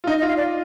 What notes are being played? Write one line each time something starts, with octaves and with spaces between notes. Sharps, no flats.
F4
D#4 D#5
D#5
F4
F5
D5